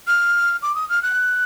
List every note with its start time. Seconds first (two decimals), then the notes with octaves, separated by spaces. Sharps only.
0.07 F6
0.62 D6
0.75 D#6
0.89 F6
1.03 F#6